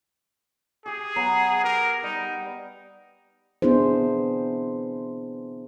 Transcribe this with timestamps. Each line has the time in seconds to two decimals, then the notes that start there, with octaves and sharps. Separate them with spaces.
0.86 G4 G#4 G#5
1.16 F#3 B3 A#5
1.64 G4 A#4
2.03 G3 D#4
3.62 B3 D4 E4 G#4 C5